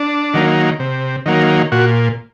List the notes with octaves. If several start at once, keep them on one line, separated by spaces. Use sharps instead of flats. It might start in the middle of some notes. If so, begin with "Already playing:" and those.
Already playing: D4
D#3 F#3 A#3
C3
D#3 F#3 A#3
A#2 F#4